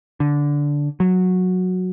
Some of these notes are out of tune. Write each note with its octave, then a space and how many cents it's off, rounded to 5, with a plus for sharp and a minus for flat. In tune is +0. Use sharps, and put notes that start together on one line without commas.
D3 -10
F#3 -10